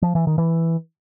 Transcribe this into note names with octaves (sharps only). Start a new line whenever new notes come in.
F3
E3
D#3
E3